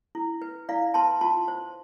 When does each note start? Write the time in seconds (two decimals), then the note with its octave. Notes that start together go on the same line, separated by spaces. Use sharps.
0.15 E4
0.42 B4
0.69 E4 D5 F5
0.94 B4 A5 C6
1.21 F4 A5 C6
1.48 C5